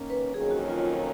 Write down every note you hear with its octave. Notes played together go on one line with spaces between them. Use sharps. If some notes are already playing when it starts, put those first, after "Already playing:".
Already playing: D#3 A#3 C#4
B4
F2 D#3 F#3 A#3 C#4 G#4
F#4
F4